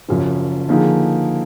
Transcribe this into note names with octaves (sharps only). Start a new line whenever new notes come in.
F#1 F#2 F3
D3 F3 A#3 D#4 G#4